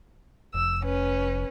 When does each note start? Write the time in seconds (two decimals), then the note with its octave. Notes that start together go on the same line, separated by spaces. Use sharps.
0.54 F1 E6
0.84 C#4 B4